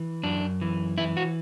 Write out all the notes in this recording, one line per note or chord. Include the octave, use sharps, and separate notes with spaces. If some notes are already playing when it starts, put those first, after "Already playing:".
Already playing: E3
F#2 D4
E3
E3 E4
F#4